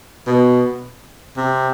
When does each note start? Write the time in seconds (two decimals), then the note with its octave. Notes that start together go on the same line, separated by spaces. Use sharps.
0.26 B2
1.37 C3